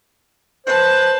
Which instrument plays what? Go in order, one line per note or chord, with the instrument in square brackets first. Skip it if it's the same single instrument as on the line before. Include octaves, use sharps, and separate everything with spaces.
[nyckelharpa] B4 A5 [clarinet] C5